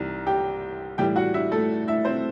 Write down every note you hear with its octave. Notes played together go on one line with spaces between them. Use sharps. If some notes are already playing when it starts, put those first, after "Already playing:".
Already playing: C2 C3 E3 G3 D#4
G4 G5
A2 E3 G3 G4 G5
F#4 F#5
E4 E5
A3 A4
E4 E5
C4 C5